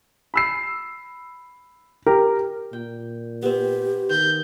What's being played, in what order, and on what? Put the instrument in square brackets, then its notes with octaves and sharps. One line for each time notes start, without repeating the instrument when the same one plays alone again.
[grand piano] B5 E6 C7
[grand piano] G4 [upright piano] A#4
[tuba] A#2 [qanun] G5
[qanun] B3 C4 [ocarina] G4
[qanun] D#3 [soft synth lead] G6